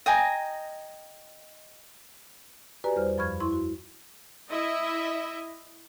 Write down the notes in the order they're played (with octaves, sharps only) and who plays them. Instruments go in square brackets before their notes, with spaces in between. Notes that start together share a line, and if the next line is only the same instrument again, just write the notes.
[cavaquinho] D#5 G5 G#5 A#5
[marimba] F#4 G4 B4 D5 G#5 A#5
E2 G3 C5 F6
F#2 F3 B5 C#6 F6 G#6
E4 C6 C#6
F#4
[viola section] E4 D#5 E5